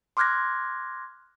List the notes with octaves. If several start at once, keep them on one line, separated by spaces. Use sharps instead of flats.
C6 D6 F6 F#6 G#6 A#6